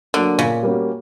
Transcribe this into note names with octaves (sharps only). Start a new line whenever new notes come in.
D3 F#3 A#3
A#2 C#3
G3 A#3 C#4 F#4